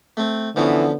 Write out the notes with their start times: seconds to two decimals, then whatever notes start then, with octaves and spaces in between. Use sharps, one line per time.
0.17 A3 C4
0.56 D3 E3 F3 B3 C#4